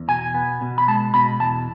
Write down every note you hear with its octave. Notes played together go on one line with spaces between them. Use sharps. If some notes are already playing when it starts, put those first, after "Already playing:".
Already playing: E2
B2 G#5
B3
B2
B5
G#3 A5
B2 B5
E2 A5